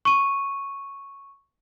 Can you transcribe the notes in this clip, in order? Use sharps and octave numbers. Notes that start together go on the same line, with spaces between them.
C#6 D#7